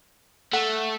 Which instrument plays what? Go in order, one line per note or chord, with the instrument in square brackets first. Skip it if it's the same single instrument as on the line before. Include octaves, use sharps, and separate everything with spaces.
[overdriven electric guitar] A3 [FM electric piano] F#5